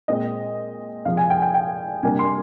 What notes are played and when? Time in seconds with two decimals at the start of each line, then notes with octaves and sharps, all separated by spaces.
0.08 A#2 G#3 C4 D#5
1.05 C3 F3 G#3 F5
1.17 G#5
1.30 G5
1.42 G5
1.54 G5
2.03 C3 G3 A#3 D4 G#5
2.19 C6